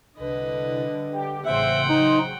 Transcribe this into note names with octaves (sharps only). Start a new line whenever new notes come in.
C2 D3 G3 B4 D#5
G4
A1 C#3 C4 C5 E5 F#5 G5
F#3 D#4